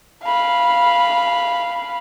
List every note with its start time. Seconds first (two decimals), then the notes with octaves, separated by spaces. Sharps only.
0.24 F5 B5